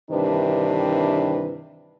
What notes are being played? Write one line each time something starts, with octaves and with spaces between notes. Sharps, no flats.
G2 C3 D#3 E3 D4 B4